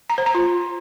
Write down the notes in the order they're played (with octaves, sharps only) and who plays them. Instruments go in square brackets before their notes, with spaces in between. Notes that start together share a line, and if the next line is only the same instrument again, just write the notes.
[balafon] A#5
C5
A#5
F4